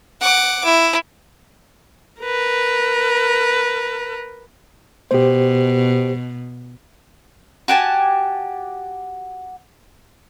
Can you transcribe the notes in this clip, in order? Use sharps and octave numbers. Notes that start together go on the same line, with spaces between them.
F#5 D6
E4
A#4 B4
B2 G4 C5
F#4 G4 G#5 A5